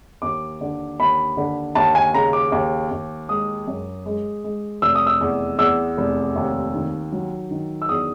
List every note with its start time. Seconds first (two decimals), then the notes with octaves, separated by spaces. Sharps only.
0.22 D#2 D6
0.61 D3
1.00 D#2 B5
1.37 D3
1.75 D#2 A5
1.95 G#5
2.14 C#3 A#5
2.33 D6
2.52 D#2
2.91 D#2
3.29 G#3 D#6
3.68 F#2
4.06 G#3
4.44 G#3
4.82 F1 E6
4.95 D#6
5.06 E6
5.21 E2
5.58 E2 E6
5.98 F1
6.36 D#2
6.75 D#3
7.12 F#3
7.51 D#3
7.82 E6
7.89 E2 D#6